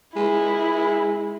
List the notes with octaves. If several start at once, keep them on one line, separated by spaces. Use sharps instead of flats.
G#3 E4